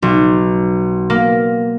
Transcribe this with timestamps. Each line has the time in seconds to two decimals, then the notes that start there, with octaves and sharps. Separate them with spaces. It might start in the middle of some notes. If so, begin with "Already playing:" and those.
0.02 B1
1.10 A#3